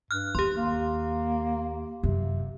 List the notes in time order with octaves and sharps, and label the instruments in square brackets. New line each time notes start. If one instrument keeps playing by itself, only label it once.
[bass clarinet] G2 [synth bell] F6 F#6
[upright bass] D#2 [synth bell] G4 C6
[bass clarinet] A#3
[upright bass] F#2 [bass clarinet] C3